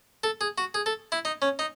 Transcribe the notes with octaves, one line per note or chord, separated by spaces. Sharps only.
A4
G#4
F#4
G#4
A4
E4
D#4
C#4
D#4